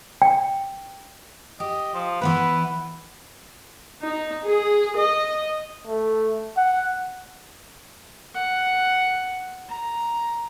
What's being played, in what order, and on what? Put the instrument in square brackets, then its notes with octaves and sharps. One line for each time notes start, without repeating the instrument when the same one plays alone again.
[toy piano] G5
[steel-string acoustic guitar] G4 [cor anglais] D#5
[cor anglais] F3
[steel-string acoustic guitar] E3 B3 E4 [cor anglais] B4
[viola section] D#4
G#4
D#5
[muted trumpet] A3
F#5
[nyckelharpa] F#5
A#5